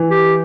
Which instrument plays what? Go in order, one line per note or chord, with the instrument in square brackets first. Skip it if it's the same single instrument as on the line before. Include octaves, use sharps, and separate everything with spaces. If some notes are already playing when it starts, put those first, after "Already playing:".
Already playing: [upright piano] E3
[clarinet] G4